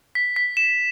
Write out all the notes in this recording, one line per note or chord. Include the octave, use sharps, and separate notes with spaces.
B6
B6
E7